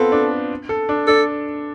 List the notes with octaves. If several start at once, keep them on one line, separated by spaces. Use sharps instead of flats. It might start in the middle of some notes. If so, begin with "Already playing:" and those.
Already playing: B3 C4 F4 A4
D4
A4
D4
D4 A4